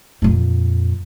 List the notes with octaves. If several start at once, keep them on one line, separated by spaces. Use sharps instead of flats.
F2 A#2